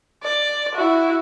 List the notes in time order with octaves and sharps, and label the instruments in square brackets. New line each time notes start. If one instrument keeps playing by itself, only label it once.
[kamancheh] D5
E4 F#4